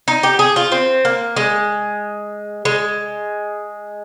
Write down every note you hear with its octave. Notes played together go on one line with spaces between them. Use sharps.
D#4
G4
G#4
F4
C4
A#3
G#3
G#3